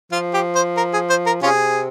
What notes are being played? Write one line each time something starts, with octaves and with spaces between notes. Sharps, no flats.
F3 F4
G4
C5
A#4
G#4
C5
A#4
C3 C#4 F4 G#4